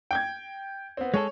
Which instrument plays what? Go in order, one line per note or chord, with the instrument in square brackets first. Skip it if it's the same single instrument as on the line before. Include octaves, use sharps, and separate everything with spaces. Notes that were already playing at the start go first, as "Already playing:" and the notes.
[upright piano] G5 G6 G#6
B3 C4
[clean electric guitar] G#3 G#4 A4 [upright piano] C#5